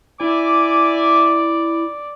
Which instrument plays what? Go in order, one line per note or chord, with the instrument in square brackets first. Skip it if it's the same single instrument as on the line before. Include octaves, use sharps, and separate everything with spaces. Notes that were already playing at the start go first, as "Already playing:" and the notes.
[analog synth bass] E4 [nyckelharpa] D5 [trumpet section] E5 G#5 D6